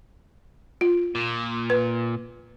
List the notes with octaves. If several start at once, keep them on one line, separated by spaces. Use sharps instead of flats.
F4
A#2
B4